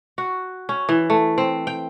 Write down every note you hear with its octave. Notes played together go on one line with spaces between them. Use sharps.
F#4
C#4
E3
A3
C4
G5